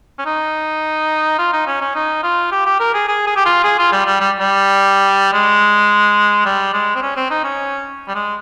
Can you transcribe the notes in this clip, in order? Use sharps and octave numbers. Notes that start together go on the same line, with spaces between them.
C#4
D#4
F4
D#4
C#4
C#4
D#4
F4
G4
G4
A#4
G#4
G#4
G#4
G4
F4
G#4
F4
G3
G3
G3
G3
G#3
G3
G#3
C4
C#4
C4
D#4
C#4
G3
G#3